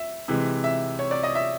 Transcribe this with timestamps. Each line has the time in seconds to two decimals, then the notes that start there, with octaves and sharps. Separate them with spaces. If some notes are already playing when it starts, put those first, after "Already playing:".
Already playing: E5
0.28 C3 E3 G#3
0.64 E5
0.99 C#5
1.11 D5
1.23 D#5
1.35 E5